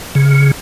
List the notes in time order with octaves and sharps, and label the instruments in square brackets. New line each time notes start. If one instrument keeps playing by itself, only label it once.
[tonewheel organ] C#3